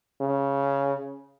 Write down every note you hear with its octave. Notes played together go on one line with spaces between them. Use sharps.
C#3